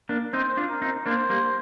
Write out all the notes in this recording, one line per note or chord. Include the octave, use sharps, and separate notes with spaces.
A#3 D4
C4 D#4 C5
D4 F4
A#4
C4 D#4
A#3 D4 C5
G3 A#3